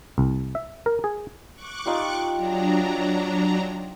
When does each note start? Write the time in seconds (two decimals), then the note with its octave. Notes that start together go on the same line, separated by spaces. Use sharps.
0.18 C2
0.55 E5
0.86 A#4
1.04 G#4
1.53 C#6 D6 F#6
1.86 D#4 F4 G4
2.35 F#3 D4 A#5